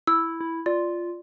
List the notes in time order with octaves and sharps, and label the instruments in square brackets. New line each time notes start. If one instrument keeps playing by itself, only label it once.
[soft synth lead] E4 [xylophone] E6
[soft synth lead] E4
[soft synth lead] F4 [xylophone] D5